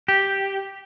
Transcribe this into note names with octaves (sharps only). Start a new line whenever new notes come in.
G4